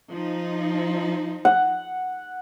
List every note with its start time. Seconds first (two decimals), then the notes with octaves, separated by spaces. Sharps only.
0.10 F3 D#4
1.45 F#5